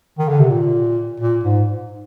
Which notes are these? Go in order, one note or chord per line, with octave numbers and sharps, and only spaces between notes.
D#3
D3
C3
A#2
A#2
G#2